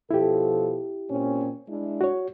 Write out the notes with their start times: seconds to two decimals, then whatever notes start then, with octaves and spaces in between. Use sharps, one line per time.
0.11 B2 F3 E4 G4 A4
1.10 A#2 C4 C#4
1.69 G#3 D4 E4
2.01 F#4 C#5